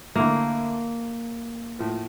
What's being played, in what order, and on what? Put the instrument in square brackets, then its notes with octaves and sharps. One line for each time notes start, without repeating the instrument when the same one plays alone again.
[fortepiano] D3 A3 E4 [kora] A#3
[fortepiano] A2 F3 A3